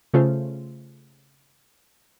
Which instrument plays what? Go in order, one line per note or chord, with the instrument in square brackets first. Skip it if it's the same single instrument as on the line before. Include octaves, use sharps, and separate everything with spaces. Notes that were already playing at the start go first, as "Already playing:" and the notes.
[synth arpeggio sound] C#3 A3 F4 A4 C5